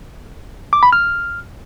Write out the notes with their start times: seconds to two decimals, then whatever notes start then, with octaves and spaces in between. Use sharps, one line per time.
0.73 D6
0.83 B5
0.93 F6